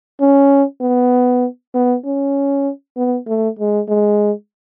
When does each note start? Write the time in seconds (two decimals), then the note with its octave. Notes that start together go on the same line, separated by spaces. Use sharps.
0.20 C#4
0.81 B3
1.74 B3
2.05 C#4
2.97 B3
3.27 A3
3.59 G#3
3.89 G#3